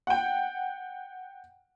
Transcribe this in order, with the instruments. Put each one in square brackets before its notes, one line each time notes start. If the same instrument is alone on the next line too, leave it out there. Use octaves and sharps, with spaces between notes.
[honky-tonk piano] F#5 G5